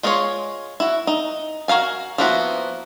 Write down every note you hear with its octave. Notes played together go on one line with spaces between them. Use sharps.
G#3 F4 G#4 C5 C#5
E4 F#4
D#4
F#4 A#4 F5 G#5
F3 A#3 B3 E4 F#4